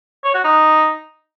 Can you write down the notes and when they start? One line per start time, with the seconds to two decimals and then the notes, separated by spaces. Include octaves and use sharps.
0.24 C#5
0.34 F#4
0.44 D#4